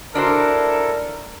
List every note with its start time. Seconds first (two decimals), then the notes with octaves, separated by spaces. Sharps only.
0.15 D4 E4 F#4 A4 A#4 C5